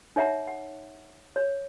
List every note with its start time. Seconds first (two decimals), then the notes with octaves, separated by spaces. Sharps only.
0.16 D#4 C#5 E5 F#5 A#5
0.47 F#5
1.36 C#5